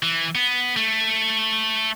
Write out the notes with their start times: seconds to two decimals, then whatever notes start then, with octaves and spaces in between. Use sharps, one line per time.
0.03 E3
0.35 B3
0.77 A3